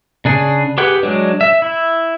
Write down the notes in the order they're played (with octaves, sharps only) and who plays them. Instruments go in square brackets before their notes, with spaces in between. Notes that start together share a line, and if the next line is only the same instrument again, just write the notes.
[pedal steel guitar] C#3 D4 G#4
G4 G#4 B4 F#5 G5
F#3 G#3 D4
E5
E4